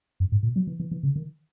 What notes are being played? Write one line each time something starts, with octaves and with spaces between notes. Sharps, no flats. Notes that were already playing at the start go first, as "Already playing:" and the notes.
F#2
G#2
A#2
F#3
E3
E3
E3
C#3
D#3